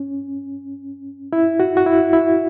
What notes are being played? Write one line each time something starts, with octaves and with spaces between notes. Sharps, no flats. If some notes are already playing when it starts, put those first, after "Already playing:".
Already playing: C#4
E4
F#4
F#4
E4
E4